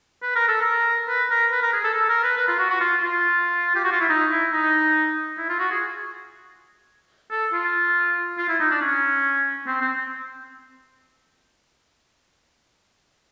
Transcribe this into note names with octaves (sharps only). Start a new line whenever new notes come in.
B4
A#4
A4
A#4
B4
A#4
B4
A#4
G#4
A4
A4
A#4
B4
B4
F4
F#4
F#4
F4
F4
G4
F#4
F4
E4
D#4
E4
D#4
E4
F4
F#4
G#4
A4
F4
F4
E4
D#4
D4
C#4
C4
C4